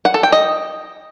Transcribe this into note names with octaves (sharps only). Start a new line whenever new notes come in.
F#5
A4
G5
D#5